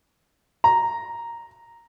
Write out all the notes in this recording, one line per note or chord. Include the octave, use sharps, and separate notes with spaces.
A#5